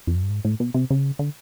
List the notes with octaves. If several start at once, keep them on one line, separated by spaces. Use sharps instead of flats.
F2
F#2
G2
G#2
A2
B2
C3
C#3
D3